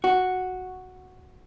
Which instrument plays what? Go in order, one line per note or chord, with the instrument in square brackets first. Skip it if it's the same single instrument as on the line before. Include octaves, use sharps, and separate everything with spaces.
[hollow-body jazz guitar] F#4